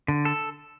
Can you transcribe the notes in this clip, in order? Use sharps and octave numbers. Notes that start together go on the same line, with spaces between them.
D3
A4